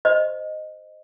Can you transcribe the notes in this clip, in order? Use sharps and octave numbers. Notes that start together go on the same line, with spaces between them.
C5 D#5